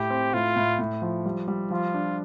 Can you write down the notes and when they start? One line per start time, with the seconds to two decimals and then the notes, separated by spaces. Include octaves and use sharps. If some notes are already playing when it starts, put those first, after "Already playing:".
Already playing: A2 G4
0.10 C4
0.33 A2 F4
0.56 A2
0.79 A2
1.02 F3
1.26 G3
1.48 G3
1.71 F3 F4
1.94 D4